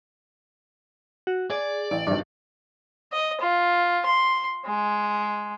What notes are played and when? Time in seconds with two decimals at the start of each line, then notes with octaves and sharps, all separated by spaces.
1.27 F#4
1.50 G#4 D5
1.91 A1 D7
2.07 G#1 G2 D6
3.12 D#5
3.41 F4
4.06 C6
4.66 G#3